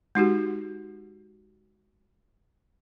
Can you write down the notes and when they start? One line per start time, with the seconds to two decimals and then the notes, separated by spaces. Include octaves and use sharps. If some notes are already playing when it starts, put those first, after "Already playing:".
0.15 G#3 D#4 F#4 G4